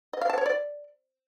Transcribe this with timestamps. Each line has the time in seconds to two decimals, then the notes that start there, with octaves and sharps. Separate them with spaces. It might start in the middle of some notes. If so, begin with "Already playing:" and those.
0.13 D#5
0.21 F5
0.30 A5
0.38 C#5
0.46 D5